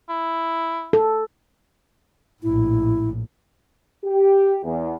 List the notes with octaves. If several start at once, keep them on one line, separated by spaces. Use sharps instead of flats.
E4
A4
A#1 A2 E4
G4
E2